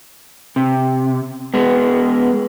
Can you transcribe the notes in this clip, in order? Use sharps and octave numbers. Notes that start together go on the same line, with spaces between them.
C3
G#3 B3